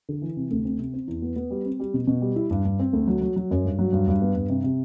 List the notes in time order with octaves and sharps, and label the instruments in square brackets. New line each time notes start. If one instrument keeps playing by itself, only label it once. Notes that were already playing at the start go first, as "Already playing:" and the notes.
[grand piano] D3
E3
C3
D2
C4
C3
C4
E2
B3
B3
G3
C4
G3
B2
B2
G3
E4
G2
G2
C4
D2
F#3
F#3
F#3
F#2
G2
F#3
G2
G2
B3
G2
C3
C3